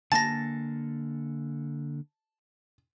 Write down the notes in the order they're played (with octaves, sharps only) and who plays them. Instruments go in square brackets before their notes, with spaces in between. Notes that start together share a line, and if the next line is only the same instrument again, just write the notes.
[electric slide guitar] D3 A#3 G#5 [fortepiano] A5 [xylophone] A6 A#6